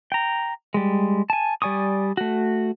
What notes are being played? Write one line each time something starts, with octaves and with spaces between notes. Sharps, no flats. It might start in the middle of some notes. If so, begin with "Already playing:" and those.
G5 A#5
G3 G#3
G#5 A5
G3 D5 G#5 C#6 D#6
A3 F#4